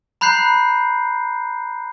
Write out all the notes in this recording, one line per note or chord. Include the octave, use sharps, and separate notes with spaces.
A#5 B5 F#6 G6 C7